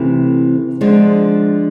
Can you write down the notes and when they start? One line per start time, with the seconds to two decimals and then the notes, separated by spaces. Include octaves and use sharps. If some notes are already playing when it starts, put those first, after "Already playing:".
Already playing: C3 E3 A3 C4 E4
0.81 D3 F3 G#3 D4